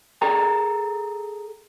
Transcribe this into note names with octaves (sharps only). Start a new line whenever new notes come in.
G#4 A4 G5 A#5